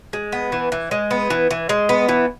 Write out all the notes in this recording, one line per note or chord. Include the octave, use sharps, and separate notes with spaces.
G#3
B3
E3
E3
G#3
B3
E3
E3
G#3
B3
E3